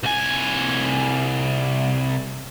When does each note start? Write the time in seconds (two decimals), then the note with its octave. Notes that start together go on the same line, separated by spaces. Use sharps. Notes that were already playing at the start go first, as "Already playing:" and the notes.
0.03 C2 G#5